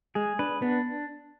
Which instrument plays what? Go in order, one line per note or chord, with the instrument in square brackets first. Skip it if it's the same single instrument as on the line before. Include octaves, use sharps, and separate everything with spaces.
[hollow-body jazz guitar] G#3 [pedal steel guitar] G#4
[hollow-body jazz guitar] D4 [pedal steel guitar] B4
[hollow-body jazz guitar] B3 [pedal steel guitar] D4